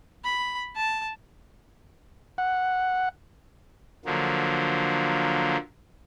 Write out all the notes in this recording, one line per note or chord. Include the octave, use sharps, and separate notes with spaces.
B5
A5
F#5
D3 F3 F#3 A#3